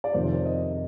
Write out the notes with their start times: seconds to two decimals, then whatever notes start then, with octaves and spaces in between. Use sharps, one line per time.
0.04 D5
0.14 F2 C3 D#3 C5
0.25 C5
0.35 C5
0.46 D#5
0.56 D#5